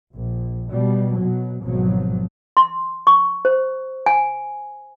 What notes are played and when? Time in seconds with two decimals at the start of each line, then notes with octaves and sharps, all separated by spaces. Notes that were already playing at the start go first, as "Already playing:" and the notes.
0.13 A#1
0.72 B2 G3
1.18 B2 F#3
1.64 G#1 B2 F3 F#3
2.57 C6
3.07 C#6
3.45 C5
4.06 G#5